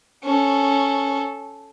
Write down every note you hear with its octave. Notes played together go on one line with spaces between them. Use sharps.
C#4 A4